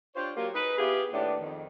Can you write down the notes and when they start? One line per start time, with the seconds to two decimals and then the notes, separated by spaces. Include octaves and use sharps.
0.15 D4 F4 G4 C5 C#5
0.36 F#3 A#3 F4 G4 A#4
0.54 D#4 G#4 B4
0.78 B3 E4 F4 G4 G#4
1.12 D#2 A2 B3 D4 G4
1.39 F2 D#3